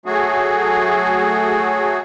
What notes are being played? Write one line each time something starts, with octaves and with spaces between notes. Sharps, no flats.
F#3 A3 F#4 G#4